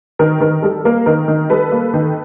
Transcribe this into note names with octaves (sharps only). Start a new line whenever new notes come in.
D#3 A#4
D#3 A#4
G3 A4
A#3 A#4
D#3 A#4
D#3
G3 A4 B4
A#3
D#3